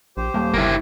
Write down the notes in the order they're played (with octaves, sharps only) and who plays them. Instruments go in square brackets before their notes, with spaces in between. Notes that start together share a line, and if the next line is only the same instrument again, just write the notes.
[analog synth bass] A#1 [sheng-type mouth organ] G4 C5
[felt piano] D#1 [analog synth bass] A#3
[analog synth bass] G1 [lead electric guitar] A#3 E4